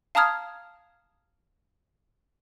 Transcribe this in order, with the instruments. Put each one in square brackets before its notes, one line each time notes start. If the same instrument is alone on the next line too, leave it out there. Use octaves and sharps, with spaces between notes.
[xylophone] F5 A5 A#5 D#6 F6 G#6